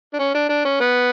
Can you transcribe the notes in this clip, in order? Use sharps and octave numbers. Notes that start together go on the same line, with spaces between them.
D4
C#4
D4
D4
C#4
B3